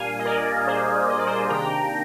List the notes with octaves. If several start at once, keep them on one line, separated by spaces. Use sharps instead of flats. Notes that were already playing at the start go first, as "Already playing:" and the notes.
Already playing: A#2 G3 A#3 D4 F5 G#5
D#5
A#4 D5
G#4 C5
D#5
D5
C5 D#5
C3 D#3 A#3 D4 G5 A#5